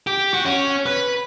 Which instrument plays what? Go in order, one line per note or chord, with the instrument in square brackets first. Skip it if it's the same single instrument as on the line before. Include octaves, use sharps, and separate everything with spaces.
[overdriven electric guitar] G4
F#4
C#4
B4